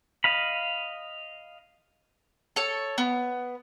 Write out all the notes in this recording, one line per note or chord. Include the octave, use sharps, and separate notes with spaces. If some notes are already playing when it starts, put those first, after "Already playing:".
D#5 F5 B5
A4 C#5
B3